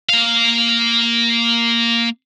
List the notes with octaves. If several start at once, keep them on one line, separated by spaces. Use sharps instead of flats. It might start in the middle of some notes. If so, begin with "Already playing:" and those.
A#3 F5